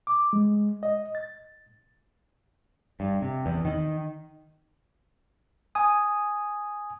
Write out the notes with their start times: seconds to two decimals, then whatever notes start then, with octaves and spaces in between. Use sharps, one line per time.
0.07 D6
0.33 G#3
0.83 D#5
1.15 A6
3.00 G2
3.22 C3
3.46 E2
3.65 D#3
5.75 G#5 D#6